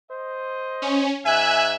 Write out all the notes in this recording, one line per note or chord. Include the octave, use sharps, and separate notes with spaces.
C5 D#5
C#4
G#2 E5 G#5 F#6